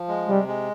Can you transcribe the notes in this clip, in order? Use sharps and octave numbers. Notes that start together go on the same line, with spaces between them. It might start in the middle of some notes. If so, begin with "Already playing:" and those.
Already playing: F3
G#3
C3 G3
G#3